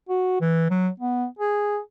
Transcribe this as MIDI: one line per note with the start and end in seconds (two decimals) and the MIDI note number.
0.09 0.38 66
0.41 0.69 52
0.70 0.89 54
1.00 1.26 59
1.39 1.79 68